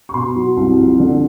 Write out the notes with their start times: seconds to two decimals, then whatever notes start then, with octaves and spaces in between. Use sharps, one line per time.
0.09 C#6
0.14 B2 C6
0.36 F#3
0.57 C2
0.78 F2
1.00 D3